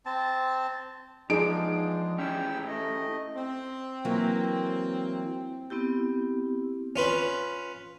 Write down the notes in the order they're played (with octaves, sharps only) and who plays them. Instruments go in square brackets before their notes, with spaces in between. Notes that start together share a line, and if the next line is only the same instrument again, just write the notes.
[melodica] C4 A5
[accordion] E2 G#3 D4 [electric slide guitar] F3 [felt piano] D#4 G#4 D7
[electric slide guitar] C#4 E4 G4 [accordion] G5 E6
[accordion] A3 D#5
[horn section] C4
[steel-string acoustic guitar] E3 F#3 A#3
[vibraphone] B3 C4 E4 G4
[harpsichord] C#4 F4 B4